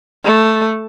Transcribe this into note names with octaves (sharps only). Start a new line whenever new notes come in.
A3